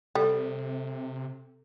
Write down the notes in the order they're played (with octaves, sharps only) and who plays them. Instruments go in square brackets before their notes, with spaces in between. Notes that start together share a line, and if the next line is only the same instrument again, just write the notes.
[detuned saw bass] C3 [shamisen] G3 [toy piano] A4